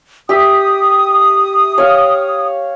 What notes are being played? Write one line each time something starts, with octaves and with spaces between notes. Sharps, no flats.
G4 E5 D#6
C#5 F5